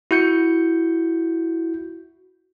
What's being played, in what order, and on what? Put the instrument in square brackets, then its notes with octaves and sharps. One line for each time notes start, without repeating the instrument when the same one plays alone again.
[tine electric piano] E4 F#4 G6 C#7